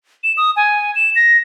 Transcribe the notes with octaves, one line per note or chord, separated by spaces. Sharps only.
E7
D#6
G#5
E7
A#6